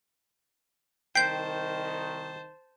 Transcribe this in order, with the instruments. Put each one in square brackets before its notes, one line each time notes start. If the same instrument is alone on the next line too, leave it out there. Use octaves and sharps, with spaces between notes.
[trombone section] C2 D#3 [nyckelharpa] C5 A5 [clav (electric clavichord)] G5 [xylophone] G6 B6 C7